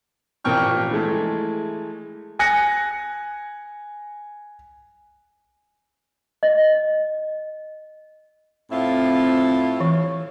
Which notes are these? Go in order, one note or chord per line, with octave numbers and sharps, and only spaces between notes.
A1 A#2 F3 G5 C#6 F6
E3 G#3 A3
G#5 F#6 A#6 C#7
D#5
A2 C4 E4 F4
E3